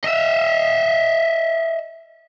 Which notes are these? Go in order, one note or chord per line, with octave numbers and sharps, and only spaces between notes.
D#5 E5